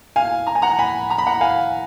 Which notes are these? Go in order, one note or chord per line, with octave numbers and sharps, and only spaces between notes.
F5 G#5
A#5
G#5
F#5 A#5
G#5 B5
A#5
B5
F#5 A#5
F5 G#5